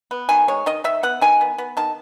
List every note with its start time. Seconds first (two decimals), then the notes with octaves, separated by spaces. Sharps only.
0.11 B3
0.29 D#3 G#5
0.48 G#3 C#5
0.66 D#3 D#5
0.84 D#3 E5
1.03 B3 F#5
1.21 D#3 G#5
1.41 B3
1.58 B3
1.77 D#3 A5